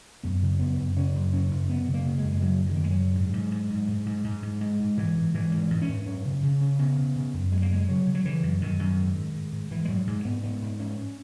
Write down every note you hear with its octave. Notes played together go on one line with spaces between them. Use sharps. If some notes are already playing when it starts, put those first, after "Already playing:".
F#2 B3
C#3
F#2 B3
F#2
C#3 C#4
F#2
C#3 C#4
F#2
F#2 B3
C#3
A#3
C#3
G#3
F#2
G#3
C#3 F#3
C#3
D#3
F#2 A#3
G#3
F#3
C#3
G#2
G#2
G#2
G#2
G#2
G#2
G#2
G#2
G#2 G#3
G#2
G#2 E3
G#2
G#2 E3
G#2
E3
G#2
C#4
G#2
F#2 C#4
C#3
C#3
C#3
C#3 B3
C#3
C#3
F#2
F#2 G#3
A#3
C#3 G#3
C#3 F#3
C#3
F#3
C#3 E3
F#2
F#2 D#3
F#2
G#2
G#2
G#2
G#2
G#2 E3
G#3
G#2 F#3
G#2 G#3
G#2 B3
G#2 B3
G#2
G#2 C#4